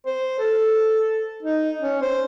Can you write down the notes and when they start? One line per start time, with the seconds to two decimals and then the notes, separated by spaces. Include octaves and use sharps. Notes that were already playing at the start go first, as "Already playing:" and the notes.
0.07 C5
0.39 A4
1.43 D#4
1.81 C#4
2.02 C5